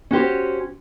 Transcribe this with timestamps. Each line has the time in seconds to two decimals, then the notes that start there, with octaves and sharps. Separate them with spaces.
0.11 C#4 F#4 G4 C5